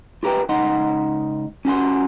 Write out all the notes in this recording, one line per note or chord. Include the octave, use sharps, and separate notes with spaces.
F4 G4 A#4 B4 G5
C#2 D#4 D#5 F#5 C6
C#4 F4 F#4 G#5 C6